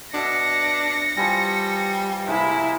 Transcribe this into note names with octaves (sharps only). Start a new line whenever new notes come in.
B2 D4 E5 A#6 C#7
E3 F3 G3
C3 G#3 A#3 E4